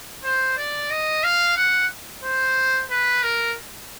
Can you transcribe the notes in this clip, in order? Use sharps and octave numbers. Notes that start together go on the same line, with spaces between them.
C5
D5
D#5
F5
F#5
C5
B4
A#4